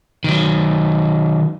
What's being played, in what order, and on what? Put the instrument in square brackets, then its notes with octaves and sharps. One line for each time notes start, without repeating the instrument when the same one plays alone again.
[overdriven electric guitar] D#3 F#3